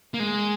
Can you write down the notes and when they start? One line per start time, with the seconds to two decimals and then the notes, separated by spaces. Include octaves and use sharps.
0.14 A#3
0.20 G#3